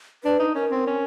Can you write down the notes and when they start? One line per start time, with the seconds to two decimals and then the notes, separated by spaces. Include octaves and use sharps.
0.24 D4 B4
0.39 D#4
0.55 C#4 A#4
0.71 C4
0.87 C#4